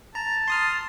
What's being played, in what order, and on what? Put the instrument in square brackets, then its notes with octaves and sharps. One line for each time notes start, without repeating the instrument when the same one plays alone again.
[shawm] A5 [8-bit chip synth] A#5
[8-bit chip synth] C6 D#6 F6